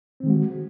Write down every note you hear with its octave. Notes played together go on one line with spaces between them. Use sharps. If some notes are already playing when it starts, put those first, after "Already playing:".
D#3 G#3 C4 F#4